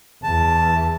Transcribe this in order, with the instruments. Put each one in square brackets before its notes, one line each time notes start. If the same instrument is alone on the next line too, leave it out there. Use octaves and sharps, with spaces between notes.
[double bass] E2 [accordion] A5